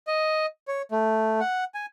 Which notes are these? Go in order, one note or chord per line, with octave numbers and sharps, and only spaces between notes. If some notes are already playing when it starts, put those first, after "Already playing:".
D#5
C#5
A3
F#5
G#5